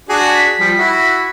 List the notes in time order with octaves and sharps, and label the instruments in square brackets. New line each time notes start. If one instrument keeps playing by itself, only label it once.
[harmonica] D4 F#4 G#4
[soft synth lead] B6
[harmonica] F3 G3
E4 F#4